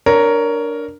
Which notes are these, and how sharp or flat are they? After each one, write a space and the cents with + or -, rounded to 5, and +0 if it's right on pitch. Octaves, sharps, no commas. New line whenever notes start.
D4 +0 A#4 +0 C#5 +15